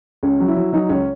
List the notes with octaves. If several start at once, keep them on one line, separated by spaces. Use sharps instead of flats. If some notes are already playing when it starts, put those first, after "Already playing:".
C#2 C#4
F#3
E4
F#3
F#3 D#4
C#2 C#4